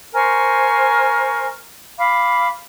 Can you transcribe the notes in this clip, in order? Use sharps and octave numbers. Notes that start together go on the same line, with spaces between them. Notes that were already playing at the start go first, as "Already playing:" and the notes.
A#4 C5 G#5 C#6
F5 B5 D6